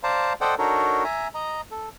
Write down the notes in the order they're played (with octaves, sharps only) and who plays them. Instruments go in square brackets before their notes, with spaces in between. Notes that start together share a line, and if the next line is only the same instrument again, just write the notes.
[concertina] C5 D5 F5 A5 A#5
A4 C5 D5 D#5 F#5 G5
D4 D#4 F#4 A4 A#4 C#5
E5 G#5 A#5
D#5 A#5
A4